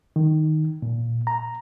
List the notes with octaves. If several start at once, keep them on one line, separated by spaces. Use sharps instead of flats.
D#3
A#2
A#5